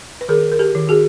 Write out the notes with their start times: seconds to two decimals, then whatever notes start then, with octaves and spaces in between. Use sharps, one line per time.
0.21 B4
0.28 D#3 G#4 A#4
0.52 A#4
0.59 G4 A4
0.75 D#3
0.89 F#4 G#4